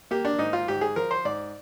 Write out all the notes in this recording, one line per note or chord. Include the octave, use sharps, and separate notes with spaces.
A#3 G4
D4
G#2 D#4
F4
G#2 G4
G#4
F3 A#4
C5
G#2 D5